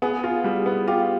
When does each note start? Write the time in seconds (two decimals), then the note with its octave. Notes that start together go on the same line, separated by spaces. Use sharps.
0.02 B3 G#4
0.24 F4
0.44 G3
0.66 B3
0.88 F4 G4